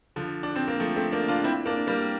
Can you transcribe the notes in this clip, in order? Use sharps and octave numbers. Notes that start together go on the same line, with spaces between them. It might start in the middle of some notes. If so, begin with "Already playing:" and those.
D3 F3
D4
C4
A#3
F3 A3
A3 C4
A#3 D4
D4 F4
C4 E4
A#3 D4
G3 A#3